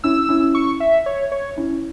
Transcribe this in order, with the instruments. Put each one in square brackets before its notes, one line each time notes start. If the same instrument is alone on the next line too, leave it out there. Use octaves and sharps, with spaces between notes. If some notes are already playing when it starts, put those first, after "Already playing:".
[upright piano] C#4 E4 [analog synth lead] E6
[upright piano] C#4 E4
[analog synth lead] C#6
E5
C#5
C#5
[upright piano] C#4 E4